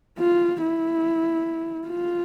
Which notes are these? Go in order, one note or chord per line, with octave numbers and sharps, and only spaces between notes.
F4
E4
F4